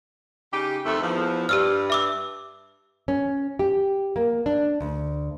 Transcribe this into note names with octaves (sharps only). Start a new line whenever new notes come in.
C#3 D#4 G4
F2 D#3 A3
E2 F3
G2 G4 E6 F6
E5 D6 E6
C#4
G4
A#3
D4
D2